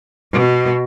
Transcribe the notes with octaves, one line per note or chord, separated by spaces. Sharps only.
B2